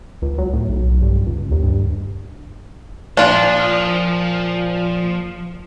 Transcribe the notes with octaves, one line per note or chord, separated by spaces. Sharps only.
C#2
F#3
A2
B1
G2
C#2
D#2
G2
A#2 F3 D4 F4